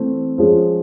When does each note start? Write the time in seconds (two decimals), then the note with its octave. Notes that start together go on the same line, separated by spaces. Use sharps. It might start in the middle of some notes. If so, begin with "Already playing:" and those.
Already playing: E3 A3 C4
0.38 F3 G#3 C#4 F4 G#4